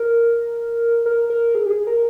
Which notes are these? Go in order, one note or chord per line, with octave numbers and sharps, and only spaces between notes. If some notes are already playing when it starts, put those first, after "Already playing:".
Already playing: A#4
A#4
A#4
G#4
G4
G#4
A#4